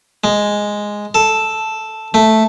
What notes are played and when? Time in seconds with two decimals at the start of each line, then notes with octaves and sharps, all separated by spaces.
0.24 G#3
1.15 A4
2.14 A3